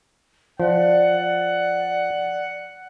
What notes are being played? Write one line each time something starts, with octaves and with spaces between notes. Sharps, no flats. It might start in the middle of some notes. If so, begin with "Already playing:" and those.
F3 D5 F#5